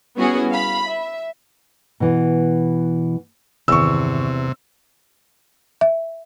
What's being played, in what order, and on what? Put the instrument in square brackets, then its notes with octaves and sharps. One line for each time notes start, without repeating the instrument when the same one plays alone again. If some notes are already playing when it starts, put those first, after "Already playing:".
[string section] G3 B3 C#4 E4 F#4 G#4
F5 B5
E5
[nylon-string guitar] B2 E3
[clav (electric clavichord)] E2 [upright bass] G2 D#3 [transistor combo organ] C3 [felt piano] C#6 E6
[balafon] E5